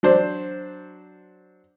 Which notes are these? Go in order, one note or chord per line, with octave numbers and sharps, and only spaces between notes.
F#3 D4 C5